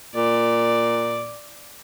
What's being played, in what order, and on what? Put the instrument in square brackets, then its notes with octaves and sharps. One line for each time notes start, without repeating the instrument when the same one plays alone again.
[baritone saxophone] A#2 [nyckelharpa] D5